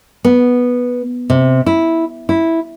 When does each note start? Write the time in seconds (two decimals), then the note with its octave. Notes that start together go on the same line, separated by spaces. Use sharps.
0.25 B3
1.30 C3
1.66 E4
2.29 E4